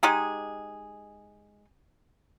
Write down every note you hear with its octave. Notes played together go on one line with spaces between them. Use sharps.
G#3 D#4 G4 G#4